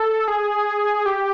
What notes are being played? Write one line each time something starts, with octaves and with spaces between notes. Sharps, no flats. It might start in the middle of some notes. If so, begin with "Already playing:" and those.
Already playing: A4
G#4
G4